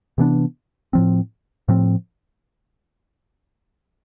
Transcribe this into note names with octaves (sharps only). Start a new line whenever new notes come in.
C3 E3 B3 D4
A2 F3 C4
A2 F3 C4